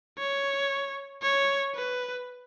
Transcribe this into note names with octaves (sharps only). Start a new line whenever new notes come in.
C#5
C#5
B4